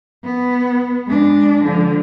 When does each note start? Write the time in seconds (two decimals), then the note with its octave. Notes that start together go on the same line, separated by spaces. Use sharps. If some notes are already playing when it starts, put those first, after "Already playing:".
0.24 B3
1.07 G#3 D4
1.64 D3 F3